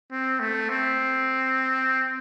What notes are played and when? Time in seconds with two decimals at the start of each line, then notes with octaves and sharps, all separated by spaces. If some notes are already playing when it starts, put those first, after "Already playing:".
0.11 C4
0.40 A3
0.69 C4